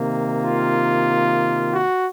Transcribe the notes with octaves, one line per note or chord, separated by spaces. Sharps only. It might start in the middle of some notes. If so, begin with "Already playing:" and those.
Already playing: C3 D#3 A#3
F4
F#4